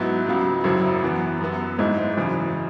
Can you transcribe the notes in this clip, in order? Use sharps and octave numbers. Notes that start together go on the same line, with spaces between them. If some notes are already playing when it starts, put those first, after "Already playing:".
Already playing: G#2 F#3 B3 E4
C#2 C#3 F#3
G#1 F#2 C#3 F#3 E4
F#2 E3 B3
F#2 F#3 B3
G#1 G#2 G#3 E4
G#1 F#2 C#3 E3